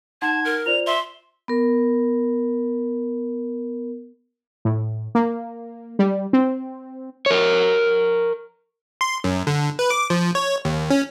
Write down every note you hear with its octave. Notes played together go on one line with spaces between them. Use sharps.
D#4 F#5 A5 C6 G#6
A#4
F4 C5 D5 F7
E5 C6
B3 A#4
A2
A#3
G3
C4
A#4 C#5
C6
F#2
D3
B4
D6
F3
C#5
D#2
C#4